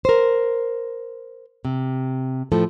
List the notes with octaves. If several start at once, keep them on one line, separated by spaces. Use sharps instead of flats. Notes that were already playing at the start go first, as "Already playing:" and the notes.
A#4 C5
C3
A2 F3 A3 A4